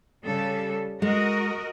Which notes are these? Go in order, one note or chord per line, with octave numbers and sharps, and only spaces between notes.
C#3 G3 A4
G#3 F#4 A#4 D#5